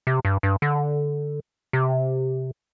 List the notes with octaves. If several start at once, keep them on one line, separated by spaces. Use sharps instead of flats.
C3
G2
G2
D3
C3